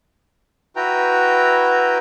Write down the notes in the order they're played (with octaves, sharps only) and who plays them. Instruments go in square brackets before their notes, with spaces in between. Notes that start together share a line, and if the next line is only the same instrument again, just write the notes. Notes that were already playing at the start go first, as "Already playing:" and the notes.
[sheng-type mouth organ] E4 F#4 B4 G5 A#5